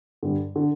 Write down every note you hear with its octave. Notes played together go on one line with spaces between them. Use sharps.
G2 D3 G3
D3